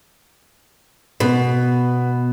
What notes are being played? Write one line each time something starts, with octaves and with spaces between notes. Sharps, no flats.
B2 B3